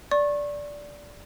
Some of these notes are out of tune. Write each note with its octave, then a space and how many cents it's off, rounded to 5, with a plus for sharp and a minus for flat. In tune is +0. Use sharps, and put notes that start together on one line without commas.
D5 -10 C#6 -30